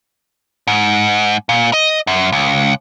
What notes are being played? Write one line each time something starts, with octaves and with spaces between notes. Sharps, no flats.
G#2
A#2
D#5
F#2
C#2